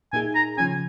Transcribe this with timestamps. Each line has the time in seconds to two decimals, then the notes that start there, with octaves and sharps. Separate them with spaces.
0.13 A#2 A#3 D#4 G#4 G#5
0.35 A#5
0.58 C#3 F3 C#4 G#5